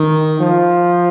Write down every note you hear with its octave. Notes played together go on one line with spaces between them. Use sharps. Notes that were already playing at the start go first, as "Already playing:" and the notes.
Already playing: D#3
F3